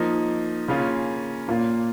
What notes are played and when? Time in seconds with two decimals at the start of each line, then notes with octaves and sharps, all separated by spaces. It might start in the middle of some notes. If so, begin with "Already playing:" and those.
Already playing: F3 A#3 D#4
0.68 C#3 A#3 C#4 F4
1.48 A#2 A#3 F4